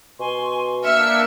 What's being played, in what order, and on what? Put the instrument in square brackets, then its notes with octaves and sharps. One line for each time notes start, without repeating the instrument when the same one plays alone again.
[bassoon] B2 [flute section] G#5 C6 C#6
[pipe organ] A#3 D4 [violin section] E5 C#7 [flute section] E6 F6